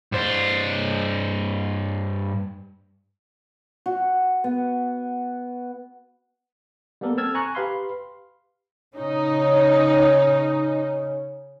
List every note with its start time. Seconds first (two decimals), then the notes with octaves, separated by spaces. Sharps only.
0.12 G2 C5
3.86 F#4
4.44 B3
7.01 G3 A#3 B3 A4 A#4
7.17 C4 A4 A5 E6 F6 G#6
7.35 G#5 A#5 C#6 F#6
7.55 G4 B4 F5 B5 C6
8.96 C#3 C#4 D#4